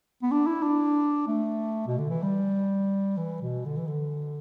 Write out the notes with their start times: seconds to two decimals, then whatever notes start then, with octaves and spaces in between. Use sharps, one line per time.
0.23 B3
0.31 D4
0.47 E4
0.63 D4
1.27 A3
1.87 B2
1.98 D3
2.10 E3
2.23 G3
3.17 E3
3.42 B2
3.65 D3
3.77 E3
3.88 D3